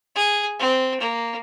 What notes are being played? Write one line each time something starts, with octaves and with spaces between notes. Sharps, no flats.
G#4
C4
A#3